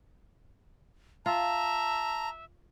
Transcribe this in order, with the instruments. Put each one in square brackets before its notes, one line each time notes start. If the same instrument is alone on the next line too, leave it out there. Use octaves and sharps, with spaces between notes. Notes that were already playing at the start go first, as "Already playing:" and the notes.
[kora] F4 [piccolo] E5 [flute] A5 [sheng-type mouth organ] A#5